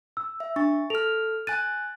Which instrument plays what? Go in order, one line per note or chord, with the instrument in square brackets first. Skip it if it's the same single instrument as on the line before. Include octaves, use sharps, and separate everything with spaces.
[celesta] E6
[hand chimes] E5
[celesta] D4 [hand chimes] C#6 A6
[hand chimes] A4 F6 [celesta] F7
[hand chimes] G#5 F#6 A6 [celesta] D#7